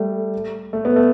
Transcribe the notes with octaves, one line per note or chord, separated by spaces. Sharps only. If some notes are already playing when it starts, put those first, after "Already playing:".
Already playing: G3 A3
A3
B3
A3